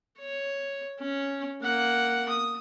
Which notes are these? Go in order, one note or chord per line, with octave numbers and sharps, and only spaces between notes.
C#5
C#4
A#3 F#5
D#6